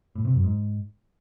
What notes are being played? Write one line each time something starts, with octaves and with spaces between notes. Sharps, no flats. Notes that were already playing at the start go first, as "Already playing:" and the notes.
A2
C3
F#2
G#2